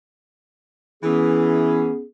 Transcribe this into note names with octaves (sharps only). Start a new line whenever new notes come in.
E3 B3 C#4 G#4